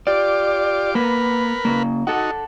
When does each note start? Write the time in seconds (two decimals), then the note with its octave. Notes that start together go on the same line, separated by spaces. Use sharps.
0.07 F4 G4 D5 D6
0.95 A#3 B3 A#4 B4 B5
1.65 C#3 A#3
2.07 D#4 F#4 A4 F#5